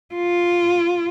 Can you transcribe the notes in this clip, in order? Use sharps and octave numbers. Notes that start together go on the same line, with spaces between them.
F4